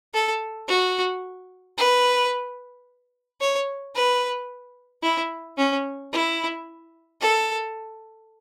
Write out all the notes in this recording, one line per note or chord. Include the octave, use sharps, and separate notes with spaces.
A4
F#4
B4
C#5
B4
E4
C#4
E4
A4